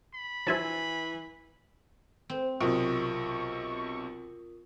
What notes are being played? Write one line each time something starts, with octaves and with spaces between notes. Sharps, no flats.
B5
A#1 E3 F#4 C5 E5 G#5 A5
C4
B1 C3 F4 A#4 C#6 D#6